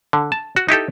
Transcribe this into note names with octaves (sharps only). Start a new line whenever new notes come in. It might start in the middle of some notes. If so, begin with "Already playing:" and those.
D3
A5
F#4
D#4 E4 G4 A4